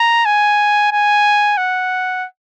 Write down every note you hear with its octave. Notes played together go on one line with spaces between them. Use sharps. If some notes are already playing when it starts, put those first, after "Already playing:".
Already playing: A#5
G#5
G#5
F#5